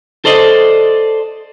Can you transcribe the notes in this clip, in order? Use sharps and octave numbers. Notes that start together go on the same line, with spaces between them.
A4 C5 D5 D#5